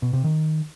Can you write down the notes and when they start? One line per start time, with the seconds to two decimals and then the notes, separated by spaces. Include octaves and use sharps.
0.02 B2
0.13 C3
0.24 D#3